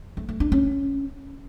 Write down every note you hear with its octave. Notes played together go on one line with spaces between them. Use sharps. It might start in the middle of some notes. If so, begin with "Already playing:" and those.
A3
A3
D4
C#4